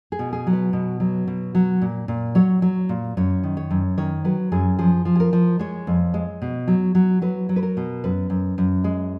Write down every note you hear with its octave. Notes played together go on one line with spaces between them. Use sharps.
G#4
B2
G#4
F#3
B4
B2
F#3
B2
F#3
A#2
A#2
F#3 C#5
F#3
A#2
F#2 C#5
D#3
C#5
F#2
D#3 C#5
F#3 B4
F#2 G#4
F3 G#4
F3
G#4
A#4
F3
G#3 C#5
F2
G#3
B2
F#3
F#3
F#3 B4
F#3
B4
A#4
B2
F#2 B4
F#2
F#2
G#3